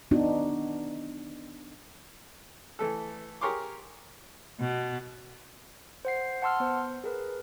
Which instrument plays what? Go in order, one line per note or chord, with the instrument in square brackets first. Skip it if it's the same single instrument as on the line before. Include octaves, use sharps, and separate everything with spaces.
[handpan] B3 D4 D#4 F#4
[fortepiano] E3 A3 A4
G4 G#4 A#4 C#5 C6 D6
[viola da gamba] B2
[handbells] C5 F#5 C7
F#5 A5 C6 E6 F6
B3 C5
G#4 A#4 B4